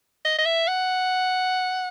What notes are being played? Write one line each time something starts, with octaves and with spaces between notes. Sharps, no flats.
D#5
D#5
E5
F#5